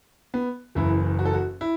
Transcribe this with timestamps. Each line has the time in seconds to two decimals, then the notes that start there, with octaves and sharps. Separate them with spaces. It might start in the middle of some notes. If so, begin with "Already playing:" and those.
0.34 B3
0.75 F#1 F#2 E3 E4
1.19 F#4
1.25 A4
1.34 F#4
1.61 E4